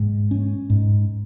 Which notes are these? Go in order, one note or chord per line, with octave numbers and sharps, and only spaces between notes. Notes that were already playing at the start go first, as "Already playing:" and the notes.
Already playing: G#2
C#4
G#2